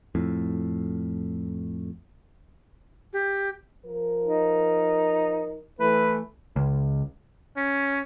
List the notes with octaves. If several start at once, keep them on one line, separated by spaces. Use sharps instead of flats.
F2 A2
G4
F3 A#4
D#4
E3 A3 B4
C#2
C#4